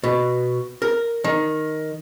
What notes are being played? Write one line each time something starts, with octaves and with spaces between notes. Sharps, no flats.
B2
A#4
D#3